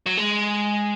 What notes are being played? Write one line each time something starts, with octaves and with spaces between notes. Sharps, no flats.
F#3
G#3